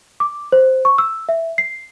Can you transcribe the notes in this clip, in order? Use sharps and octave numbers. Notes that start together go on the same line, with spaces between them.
D6
C5
C#6
E6
E5
C7